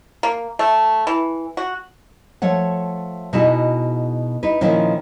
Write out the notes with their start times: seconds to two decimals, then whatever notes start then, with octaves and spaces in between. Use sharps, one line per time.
0.23 A#3
0.59 A3
1.07 E3
1.57 F#4
2.42 F3 A3 C#5 F#5
3.33 B2 D#4 E4 F#4 G#4
4.43 D#4 E4 B4
4.61 A#2 D#3 F3 C#4 E4